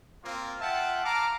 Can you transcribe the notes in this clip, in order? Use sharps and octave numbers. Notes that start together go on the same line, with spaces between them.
A#3 C4 F4
F4 E5 F#5 G5 A5
F5 A5 A#5 D6